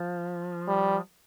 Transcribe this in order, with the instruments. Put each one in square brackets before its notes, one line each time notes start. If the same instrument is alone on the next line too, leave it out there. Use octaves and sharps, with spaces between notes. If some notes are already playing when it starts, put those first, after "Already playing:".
Already playing: [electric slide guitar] F3
[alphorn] G3